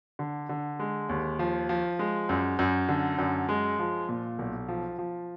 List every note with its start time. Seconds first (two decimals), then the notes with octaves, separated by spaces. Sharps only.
0.19 D3
0.49 D3
0.80 G#3
1.09 D#2
1.39 F3
1.69 F3
1.99 G#3
2.29 F#2
2.59 F#2
2.89 D3
3.19 F#2
3.49 G#3
3.79 F3
4.09 A#2
4.39 B1
4.68 F3
4.98 F3